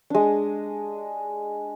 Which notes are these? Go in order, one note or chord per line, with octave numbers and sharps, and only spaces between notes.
G#3 D4